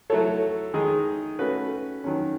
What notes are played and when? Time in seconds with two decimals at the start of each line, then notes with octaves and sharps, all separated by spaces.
0.10 F#3 A3 E4 A4 C#5
0.74 D#3 G#3 D#4 G#4
1.39 A3 C#4 F#4 B4
2.04 D#3 F#3 C#4